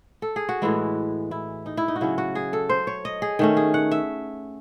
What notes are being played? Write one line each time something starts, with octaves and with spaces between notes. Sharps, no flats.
A4
G#4
F#4
A2 E3 G#3 E4
E4
D#4
E4
D#4
F#4
C#3 F#3 C#4 E4
F#4
G#4
A4
C5
C#5
D#5
G#4
D#3 A3 C#4
G#4
F#5
E5